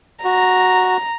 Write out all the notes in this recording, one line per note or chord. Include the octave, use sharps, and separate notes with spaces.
F#4 A#5